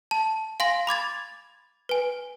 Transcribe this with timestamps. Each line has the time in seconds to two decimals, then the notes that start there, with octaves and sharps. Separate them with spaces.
0.11 A5
0.60 F5 G#5 C6 A#6 F#7
0.87 B5 D6 G#6 A6
1.89 B4 G#5